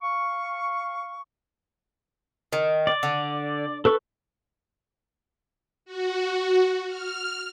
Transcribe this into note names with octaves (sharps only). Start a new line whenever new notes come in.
F5 C#6
D#3
D5
D3
A4 B4 C#6
F#4
F6